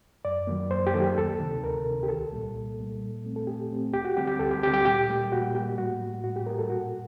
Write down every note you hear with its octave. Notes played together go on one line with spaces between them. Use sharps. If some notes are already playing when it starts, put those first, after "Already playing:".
F#2 D5
D#3 F#3 A#3
F#2 C5
G4
D#3 F#3 A#3 A4
G4
D2 A4
C3 D#3
D2 A#4
C3 D#3
G4
C2 A4
A#2 G3 A#3
C2
A#2 G3 A#3
A#2
A3 C4
A4
A#2 G4
A3 C4
D2 G4
F#4
D3 G3 C4 G4
G4
D2 A4
G4
D3 G3 C4 G4
G4
A#2 G4
G3 A#3
A#2 F#4
G3 A#3 G4
A2 F#4
G3 A#3
A2 F#4
G4
G3 A#3 A#4
A4
A#2 F#4